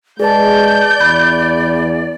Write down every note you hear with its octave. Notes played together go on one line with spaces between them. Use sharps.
G#3 G#4 B4 D5 A5 G6
E2 B5